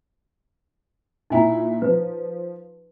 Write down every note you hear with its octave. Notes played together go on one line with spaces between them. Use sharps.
A#2 D#4 E4 G#5 A#5
F3 B4